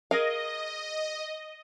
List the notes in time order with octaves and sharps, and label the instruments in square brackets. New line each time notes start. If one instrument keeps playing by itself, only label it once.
[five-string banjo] G#4 A#4 F5 [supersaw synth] D#5